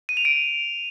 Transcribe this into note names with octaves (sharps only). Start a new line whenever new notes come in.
D#7
F7
D7